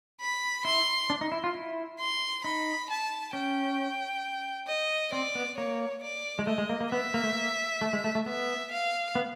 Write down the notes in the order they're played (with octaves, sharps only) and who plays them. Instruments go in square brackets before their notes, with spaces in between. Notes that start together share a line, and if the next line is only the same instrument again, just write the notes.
[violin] B5
[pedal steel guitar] E4 [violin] C6
[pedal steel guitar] D4
D#4
E4
F4
E4
[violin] C6
[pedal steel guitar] D#4 [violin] B5
[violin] A5
[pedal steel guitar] C#4 [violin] G5
[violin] D#5
[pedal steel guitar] C4 [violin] D5
[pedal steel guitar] B3
[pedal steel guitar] A#3 [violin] C#5
[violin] D5
[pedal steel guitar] G#3
[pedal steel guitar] A3 [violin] D#5
[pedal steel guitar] G#3
A#3
A#3
[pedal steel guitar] B3 [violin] E5
[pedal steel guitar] A#3
A3
A#3
A3
G#3
A3
A3
[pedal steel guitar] B3 [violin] E5
[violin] F5
[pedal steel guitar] B3